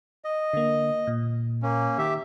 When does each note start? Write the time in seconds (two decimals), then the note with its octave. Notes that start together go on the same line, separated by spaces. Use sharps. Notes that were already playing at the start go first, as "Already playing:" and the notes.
0.25 D#5
0.53 D3 A#3
1.07 A#2
1.63 A#3 C#4
1.98 D#3 G4 E5